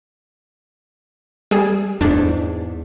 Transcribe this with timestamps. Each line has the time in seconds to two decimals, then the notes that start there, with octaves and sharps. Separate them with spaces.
1.51 G3 G#4
2.01 E2 G#2 D4